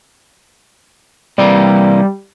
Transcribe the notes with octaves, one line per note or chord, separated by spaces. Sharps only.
C3 E3 G3 A#3